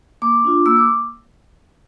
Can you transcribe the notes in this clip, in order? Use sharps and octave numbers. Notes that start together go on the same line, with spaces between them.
A#3 D6
D4 F4
A#3 E6
D6